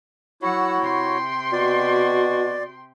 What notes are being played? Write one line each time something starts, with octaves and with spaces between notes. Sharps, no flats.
F#3 E4 F#4 C#5 F#5 E6
C3 G5 C6
B2 F#4 D5